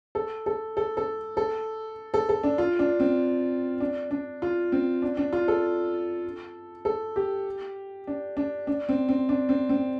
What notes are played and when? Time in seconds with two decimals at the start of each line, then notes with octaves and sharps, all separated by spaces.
0.15 A4
0.46 A4
0.77 A4
0.97 A4
1.37 A4
2.14 A4
2.29 A4
2.43 D4
2.58 F4
2.79 D4
3.00 C4
3.80 D4
4.11 D4
4.42 F4
4.72 C4
5.02 D4
5.17 D4
5.33 F4
5.48 A4
6.85 A4
7.16 G4
8.07 D4
8.37 D4
8.67 D4
8.89 C4
9.09 C4
9.29 D4
9.49 C4
9.69 C4